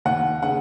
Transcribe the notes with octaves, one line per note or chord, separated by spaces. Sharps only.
D#2 F#5
C#3 F#5